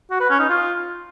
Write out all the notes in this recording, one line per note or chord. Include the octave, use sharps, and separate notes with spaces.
F#4
B4
C#4
D#4
F4